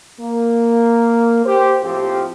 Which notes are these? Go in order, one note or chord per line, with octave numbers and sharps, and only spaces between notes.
A#3
G4 C5
A2 F3 C4 F4 G4